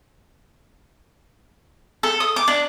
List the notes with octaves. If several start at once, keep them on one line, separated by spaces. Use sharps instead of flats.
A4
D#6
D6
D4